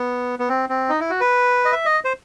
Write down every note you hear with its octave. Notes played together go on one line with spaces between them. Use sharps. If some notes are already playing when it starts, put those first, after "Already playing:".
Already playing: B3
B3
C4
C4
D#4
E4
F#4
B4
D#5
E5
D#5
C5